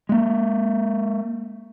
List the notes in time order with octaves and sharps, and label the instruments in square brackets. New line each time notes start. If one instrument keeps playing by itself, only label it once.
[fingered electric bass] G#3 A#3